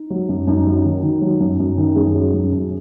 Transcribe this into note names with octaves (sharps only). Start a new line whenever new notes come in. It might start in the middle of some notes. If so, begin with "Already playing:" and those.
Already playing: D#4
F#3
F#2
F#2 D#4
F#3
D#3
D#3
F#3
F#2
F#2
D#3
F#2 G#4
F#3
F#2
F#2